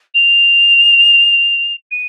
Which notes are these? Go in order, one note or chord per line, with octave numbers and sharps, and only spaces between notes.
F7
D#7